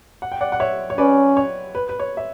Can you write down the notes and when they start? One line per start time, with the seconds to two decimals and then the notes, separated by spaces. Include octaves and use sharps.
0.22 F#5
0.32 G5
0.41 D5 F#5
0.52 F#5
0.60 C#5 E5
0.90 C#5
0.98 C#4 B4 D5
1.37 C#5
1.75 B4
1.89 B4
2.00 C#5
2.17 E5